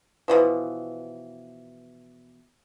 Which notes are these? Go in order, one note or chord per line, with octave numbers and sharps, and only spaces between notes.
B2 D3 E3 F3